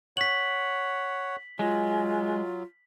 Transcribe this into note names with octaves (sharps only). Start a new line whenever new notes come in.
C#5 F#5 B6 F#7
F#3 G#3 F4